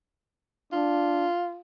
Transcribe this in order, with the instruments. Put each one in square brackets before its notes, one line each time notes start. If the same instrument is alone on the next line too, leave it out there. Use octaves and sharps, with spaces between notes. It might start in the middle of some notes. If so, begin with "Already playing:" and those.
[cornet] D4 [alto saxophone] F4